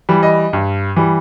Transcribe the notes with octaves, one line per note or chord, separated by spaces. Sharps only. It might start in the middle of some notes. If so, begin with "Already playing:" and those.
E3 G3
D#5
G2
E3 G3